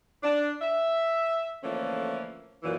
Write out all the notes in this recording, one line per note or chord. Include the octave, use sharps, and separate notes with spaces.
D4
E5
D3 E3 F3 A3 A#3 C#4
F#2 A#2 E3